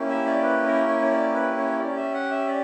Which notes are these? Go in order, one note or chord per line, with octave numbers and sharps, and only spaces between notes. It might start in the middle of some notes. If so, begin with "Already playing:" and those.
Already playing: A#3 C#4 E4 G4
E5
D5
B4
A#4
C#5
C#5
D5
B4
C#5
C#4 G4 D5
E5
F#5
E5
D5